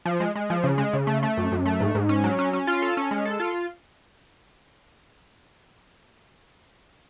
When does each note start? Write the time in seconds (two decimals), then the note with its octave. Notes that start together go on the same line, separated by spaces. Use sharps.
0.05 F3
0.20 G#3
0.35 G#3
0.50 F3
0.64 C#3
0.78 G#3
0.93 C#3
1.07 A3
1.23 A3
1.37 F#2
1.52 F#2
1.66 A3
1.80 G#2
1.95 G#2
2.09 C#4
2.24 F#3
2.39 C#4
2.53 C#4
2.67 F4
2.82 A4
2.97 C#4
3.11 G#3
3.25 A4
3.40 F4